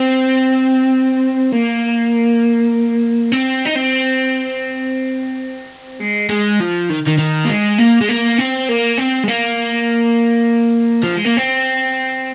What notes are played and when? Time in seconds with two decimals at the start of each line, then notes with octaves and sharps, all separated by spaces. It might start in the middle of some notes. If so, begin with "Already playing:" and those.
Already playing: C4
1.52 A#3
3.32 C4
3.66 D#4
3.76 C4
6.00 G#3
6.30 G#3
6.60 F3
6.90 D#3
7.07 D#3
7.19 D#3
7.45 A#3
7.49 G#3
7.78 A#3
8.01 G#3
8.09 A#3
8.38 C4
8.69 A#3
8.98 C4
9.24 G#3
9.28 A#3
11.04 F3
11.14 G#3
11.25 A#3
11.37 C4